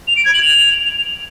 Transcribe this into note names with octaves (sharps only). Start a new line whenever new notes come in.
F7
D7
G#6
F#7
F7